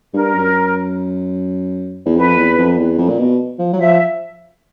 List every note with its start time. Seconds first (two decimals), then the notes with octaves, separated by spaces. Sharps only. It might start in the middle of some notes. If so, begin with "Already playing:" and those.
0.14 G2 A#4
0.34 F#2
2.05 E2
2.16 F2 B4
2.37 E2
2.58 F2
2.78 E2
2.98 F2
3.09 A#2
3.19 B2
3.59 F3
3.72 F#3
3.79 F3 E5